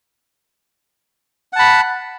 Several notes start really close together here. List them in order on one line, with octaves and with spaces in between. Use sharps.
F#5 A5 B5